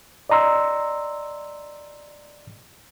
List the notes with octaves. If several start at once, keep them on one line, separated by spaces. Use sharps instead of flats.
D5 D#5 A#5 C6 E6